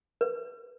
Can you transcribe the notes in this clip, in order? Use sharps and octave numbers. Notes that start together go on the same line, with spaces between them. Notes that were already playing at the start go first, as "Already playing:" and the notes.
B4